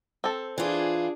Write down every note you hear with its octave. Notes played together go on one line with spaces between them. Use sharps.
C4 A4
E3 D4 F4 G#4